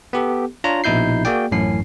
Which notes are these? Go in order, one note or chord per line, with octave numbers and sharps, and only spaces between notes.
B3 G4 A4
D4 F4 C#5 A#5
A#1 B2 D#4 E4 G6 C7
A#3 F#4 G#4 D5 G5
A1 F#2 A2 C#4 C7